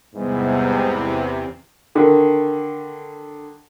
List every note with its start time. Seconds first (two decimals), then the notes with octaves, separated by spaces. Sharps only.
0.14 E2 G#2 C3 E3 G3 B3
1.95 D3 D#3